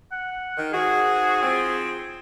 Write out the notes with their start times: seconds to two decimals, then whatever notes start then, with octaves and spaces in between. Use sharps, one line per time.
0.12 F#5
0.56 D#3
0.72 G#2 F#4 G#4
1.42 F3 C4